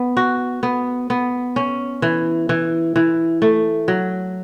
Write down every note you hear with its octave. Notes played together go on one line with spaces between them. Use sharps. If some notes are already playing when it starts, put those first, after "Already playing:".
Already playing: B3
F#4
B3
B3
C#4
E3
E3
E3
A3
F#3